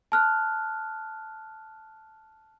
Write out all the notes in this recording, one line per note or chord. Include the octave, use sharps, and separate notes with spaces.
A5 F6 F#6